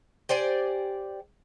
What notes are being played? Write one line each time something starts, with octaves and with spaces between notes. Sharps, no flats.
G4 C5 D5 G#5